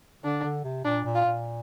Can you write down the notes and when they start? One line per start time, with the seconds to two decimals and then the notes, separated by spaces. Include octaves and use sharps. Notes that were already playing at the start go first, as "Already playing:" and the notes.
0.24 D3 D4
0.44 D3
0.64 C3
0.85 A#2 D4
1.05 A#2
1.15 F4
1.25 A#2